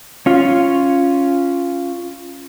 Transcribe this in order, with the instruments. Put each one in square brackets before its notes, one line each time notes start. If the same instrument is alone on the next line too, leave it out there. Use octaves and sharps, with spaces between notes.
[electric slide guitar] C#4 F4